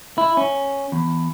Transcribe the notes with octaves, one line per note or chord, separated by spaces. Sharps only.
E4
C#4
E2